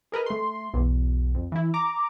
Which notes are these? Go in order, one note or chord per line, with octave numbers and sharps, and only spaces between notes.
G#4 A#4 B4 D#5
A3 C6
B1 E2
F2
E3 E4
A#5 D6